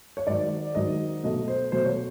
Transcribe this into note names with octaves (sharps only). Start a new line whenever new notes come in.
C#5
G#2 D#3 F#3 D5
G#2 D#3 F#3 D#5
B2 F#3 A3 D#5
C5
B2 F#3 A3 C5
C#5